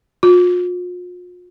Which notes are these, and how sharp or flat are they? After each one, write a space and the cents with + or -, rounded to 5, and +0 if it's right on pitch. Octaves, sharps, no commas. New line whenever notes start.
F4 +40